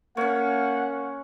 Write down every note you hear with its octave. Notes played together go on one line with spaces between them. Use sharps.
A#3 C#4 C#5 F#5